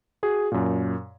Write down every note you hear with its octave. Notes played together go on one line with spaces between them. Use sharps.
F#4 G#4
F#2 A#2